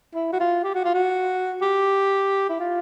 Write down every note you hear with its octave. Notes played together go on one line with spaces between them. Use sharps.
E4
F#4
F4
G4
F#4
F4
F#4
G4
E4
F4